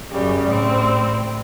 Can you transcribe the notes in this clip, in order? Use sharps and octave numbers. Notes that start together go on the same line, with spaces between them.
F#2 C#3 G3 G4
A2 G3 C4